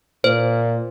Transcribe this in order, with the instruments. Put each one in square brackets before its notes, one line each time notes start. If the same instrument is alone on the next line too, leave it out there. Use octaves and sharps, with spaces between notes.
[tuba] A#2 [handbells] C5